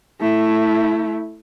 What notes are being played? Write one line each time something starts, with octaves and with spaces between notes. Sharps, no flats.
A3 E4